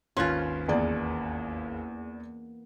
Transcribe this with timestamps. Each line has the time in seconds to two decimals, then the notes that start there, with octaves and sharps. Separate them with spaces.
0.17 G#1 D#2 C#4 F4 B4 C6 F#6
0.68 E2 E3 A#3 B3 G#4 D5